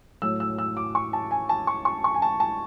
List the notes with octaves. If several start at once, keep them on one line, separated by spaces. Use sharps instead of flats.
A2 F#3 E6
E6
E6
D6
C#6
A5
G#5
A5
C#6
C#6
C#6
G#5
A5
A5